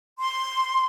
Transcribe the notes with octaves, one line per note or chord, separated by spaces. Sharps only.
C6